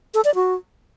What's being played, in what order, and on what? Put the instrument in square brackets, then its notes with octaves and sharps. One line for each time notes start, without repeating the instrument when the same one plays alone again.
[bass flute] A4
D5
F#4